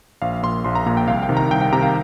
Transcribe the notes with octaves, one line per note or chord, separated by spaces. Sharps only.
A#1 F5
A#2 C6
A#1 C6
A#5
A#2 A#5
G5
C2 F5
G5
C3 D#3
A#5
C2 G5
G5
C3 D#3 A#5
F5